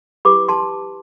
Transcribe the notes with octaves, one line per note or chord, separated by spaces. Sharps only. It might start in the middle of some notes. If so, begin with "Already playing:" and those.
E4 G4 B4 B5 D6
A5 C6